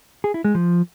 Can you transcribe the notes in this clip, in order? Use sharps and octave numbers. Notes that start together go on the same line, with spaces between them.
G#4
E4
G#3
F3